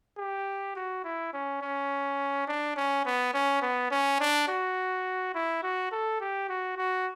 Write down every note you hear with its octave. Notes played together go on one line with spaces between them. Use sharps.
G4
F#4
E4
C#4
C#4
D4
C#4
B3
C#4
B3
C#4
D4
F#4
E4
F#4
A4
G4
F#4
F#4